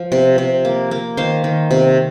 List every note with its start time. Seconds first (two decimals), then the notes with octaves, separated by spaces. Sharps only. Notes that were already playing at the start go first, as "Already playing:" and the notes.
Already playing: F3
0.12 C3
0.38 C3
0.65 A#3
0.91 A#3
1.17 D#3 C5 F5
1.44 D#3
1.71 C3